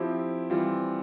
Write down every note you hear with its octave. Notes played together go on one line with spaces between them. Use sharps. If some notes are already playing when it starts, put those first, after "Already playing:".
Already playing: F3 C4 E4 G4
E3 G3 C4 F4